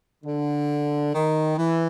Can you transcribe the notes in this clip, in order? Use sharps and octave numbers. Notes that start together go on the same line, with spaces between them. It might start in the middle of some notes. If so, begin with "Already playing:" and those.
D3
D#3
E3